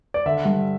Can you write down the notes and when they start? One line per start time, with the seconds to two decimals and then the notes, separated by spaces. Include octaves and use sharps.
0.14 D5
0.26 D3 E5
0.45 G2